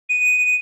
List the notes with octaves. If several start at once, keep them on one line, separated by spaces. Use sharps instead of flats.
D#7